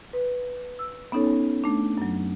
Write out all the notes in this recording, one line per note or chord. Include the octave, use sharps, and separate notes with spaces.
B4
E6
B3 C#4 D#4 A4 C#5
A3 D4
F#2 F#3